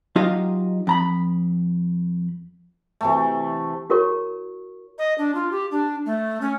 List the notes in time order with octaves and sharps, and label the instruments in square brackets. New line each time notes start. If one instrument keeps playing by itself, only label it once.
[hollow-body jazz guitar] F#3 D#4 F4 G4 D#5 F5
F2 A#5 B5
[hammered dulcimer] C3 E3 A3
[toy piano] E4 F#4 A#4 C#5 C#6
[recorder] D#5
D4
F4
G4
D4
A3
C#4